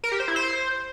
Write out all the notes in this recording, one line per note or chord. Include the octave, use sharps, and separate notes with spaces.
A#4
G4
C5
E4
C5